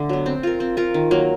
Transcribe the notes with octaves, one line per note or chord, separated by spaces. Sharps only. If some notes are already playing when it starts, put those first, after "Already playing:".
Already playing: D3 A3
F#3 B3
C4
F4 A#4
C4
F4 A#4
D#3
F#3 A#3